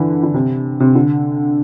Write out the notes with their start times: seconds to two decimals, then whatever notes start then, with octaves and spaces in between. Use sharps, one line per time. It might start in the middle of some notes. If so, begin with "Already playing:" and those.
Already playing: D3 E3
0.23 D3
0.34 C3
0.80 C3
0.95 D3